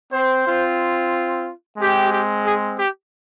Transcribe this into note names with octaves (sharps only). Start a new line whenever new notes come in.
C4 C5
C4 F4
G#3 C4 G4
G4
G#4
G4